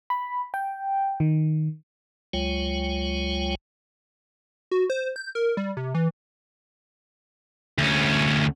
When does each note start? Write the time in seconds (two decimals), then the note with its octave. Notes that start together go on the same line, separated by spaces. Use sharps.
0.10 B5
0.54 G5
1.20 D#3
2.33 C#2 F#3 G#3 F4 C#5 G5
4.71 F#4
4.90 C5
5.16 G6
5.35 A#4
5.57 G3
5.77 C3
5.95 E3
7.78 D2 C#4